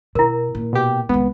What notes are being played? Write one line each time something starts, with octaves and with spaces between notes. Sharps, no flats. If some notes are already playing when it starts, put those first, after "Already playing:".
B2 E4 A#4
A#2
B2 G4
C2 G#3 B3